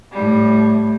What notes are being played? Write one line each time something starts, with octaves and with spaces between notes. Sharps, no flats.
A2 G3